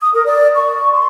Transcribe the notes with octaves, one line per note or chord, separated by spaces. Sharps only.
D#6
A#4
D5
C#6
C6